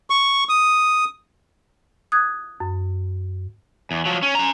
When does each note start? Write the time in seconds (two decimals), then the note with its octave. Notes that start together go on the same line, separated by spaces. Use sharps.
0.10 C#6
0.49 D#6
2.12 D#6 F#6 G#6
2.60 F#2
3.91 E2
4.05 F3 F#3
4.23 C#4
4.35 C#4 A#5